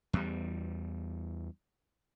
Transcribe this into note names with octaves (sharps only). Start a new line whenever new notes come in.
E2 G3